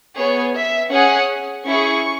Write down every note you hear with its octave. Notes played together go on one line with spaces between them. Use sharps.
B3 G#4 C#5
E5
C#4 G#4 F#5
C#4 E4 G#4 C#6